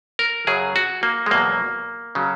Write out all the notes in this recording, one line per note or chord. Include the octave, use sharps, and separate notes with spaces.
A#4
F#2 C#3 F#3 G#4
F#4
A#3
G#3
E2 B2 F#3 A#3
C#3 F#3